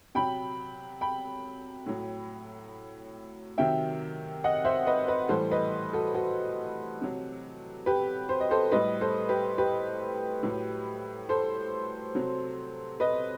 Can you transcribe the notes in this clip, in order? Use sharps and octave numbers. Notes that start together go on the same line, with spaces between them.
C3 F#3 G5 B5
G5 B5
A2 F#3
C3 D#3 F#3 E5 G5
D#5 F#5
C5 E5
B4 D#5
B4 D#5
A2 E3 G3 A4 C5
B4 D#5
F#4 A4
F#4 A4
C3 F#3
G4 B4
C5
D#5
A4 C5
A2 G3 B4 D#5
A4 C5
G4 B4
G4 B4
A2 F#3
A4 C5
C3 F#3
B4 D#5